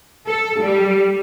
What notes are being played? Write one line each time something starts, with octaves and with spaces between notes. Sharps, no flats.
A4
G3